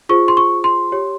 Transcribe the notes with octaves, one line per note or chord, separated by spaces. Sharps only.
F4 G#4 C5 C#6
C6
C#6
C6
G4 C#5